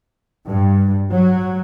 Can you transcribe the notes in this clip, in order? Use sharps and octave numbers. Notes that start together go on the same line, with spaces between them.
G2
F#3